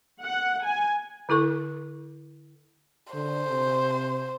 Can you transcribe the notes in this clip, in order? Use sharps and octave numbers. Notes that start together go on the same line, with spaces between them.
F#5
G#5
D3 E4 A4 C#6
D3 C5
C3